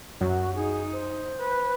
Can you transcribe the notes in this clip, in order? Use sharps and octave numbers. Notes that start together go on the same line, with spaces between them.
F#2 F#4
D#4 G#4
C5
B4